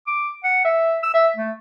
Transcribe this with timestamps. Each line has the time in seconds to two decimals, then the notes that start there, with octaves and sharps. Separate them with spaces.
0.07 D6
0.44 F#5
0.64 E5
1.03 E6
1.14 E5
1.37 A3